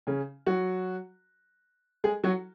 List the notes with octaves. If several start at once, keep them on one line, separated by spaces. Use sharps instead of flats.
C#3 C#4
F#3 F#4
G#3 G#4
F#3 F#4